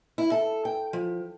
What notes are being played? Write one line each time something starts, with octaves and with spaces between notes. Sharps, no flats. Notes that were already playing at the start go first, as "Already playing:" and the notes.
E4
A4
G5
F3